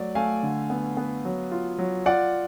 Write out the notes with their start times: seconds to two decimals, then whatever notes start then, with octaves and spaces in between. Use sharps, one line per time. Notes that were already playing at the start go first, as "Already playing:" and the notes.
Already playing: F#3 A3 D5
0.15 A3 F5 G#5
0.43 D3
0.70 B3
0.97 B3
1.25 F#3
1.52 F4
1.78 F#3
2.06 F4 D5 F#5